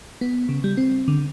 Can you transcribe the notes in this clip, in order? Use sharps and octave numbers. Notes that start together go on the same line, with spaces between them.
B3
C#3
G3
C4
D3